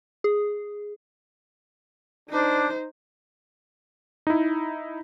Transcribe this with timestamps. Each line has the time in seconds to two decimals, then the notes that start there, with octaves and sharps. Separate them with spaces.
0.24 G#4
2.30 D4 D#4 C5
4.27 D#4 E4